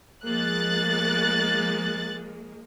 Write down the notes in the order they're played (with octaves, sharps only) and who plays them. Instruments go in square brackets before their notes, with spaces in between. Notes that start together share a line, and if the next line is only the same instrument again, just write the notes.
[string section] F3 G#3 A#3 [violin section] F#6 A6